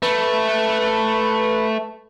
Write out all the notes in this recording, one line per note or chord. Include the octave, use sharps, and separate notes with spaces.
A3 B4